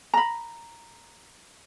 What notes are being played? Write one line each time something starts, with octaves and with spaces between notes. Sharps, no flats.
A#5 B5